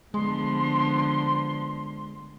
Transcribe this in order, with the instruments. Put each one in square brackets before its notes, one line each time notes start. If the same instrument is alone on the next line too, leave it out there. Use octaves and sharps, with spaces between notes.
[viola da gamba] D3 F3 B3 [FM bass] G#3 [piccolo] C6